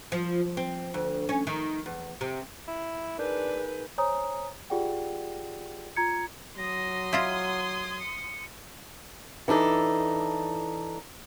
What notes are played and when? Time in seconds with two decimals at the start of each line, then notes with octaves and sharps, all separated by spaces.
0.12 F3
0.57 C4
0.94 D2
1.29 C#4
1.47 D#3
1.86 E2
2.21 C3
2.68 E4
3.19 D4 D#4 G#4 A#4 B4 G6
3.98 C5 C#5 G#5 A#5 D#6
4.70 F4 G4 G#4 D5 F#5 G5
5.96 F4 A#5 G#6 C#7
6.57 F#3 C6 D#6 A#6
7.13 E4 F4 D#5 G#6
8.00 C#7
9.48 E3 D4 D#4 A4